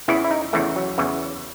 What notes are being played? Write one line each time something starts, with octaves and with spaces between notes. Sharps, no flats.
E2 C#3 E3 E4
E4
D#4
E2 C#3 E3 A3
F#3
E2 C#3 E3